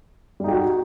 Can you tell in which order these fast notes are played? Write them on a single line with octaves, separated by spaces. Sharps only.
G3 D#4 G4 F#4